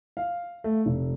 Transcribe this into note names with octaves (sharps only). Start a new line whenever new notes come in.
F5
A3
F1